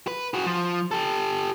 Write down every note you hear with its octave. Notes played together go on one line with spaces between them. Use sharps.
B4
F#4 G#4
F3
G4 A4